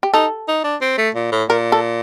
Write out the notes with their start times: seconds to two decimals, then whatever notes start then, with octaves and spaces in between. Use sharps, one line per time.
0.03 G4
0.14 D#4 A4
0.48 D#4
0.64 D4
0.81 C4
0.98 A3
1.15 A#2
1.32 A2
1.49 A#2 A#4
1.72 A4